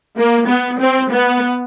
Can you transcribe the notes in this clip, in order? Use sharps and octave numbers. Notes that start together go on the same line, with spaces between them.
A#3
B3
C4
B3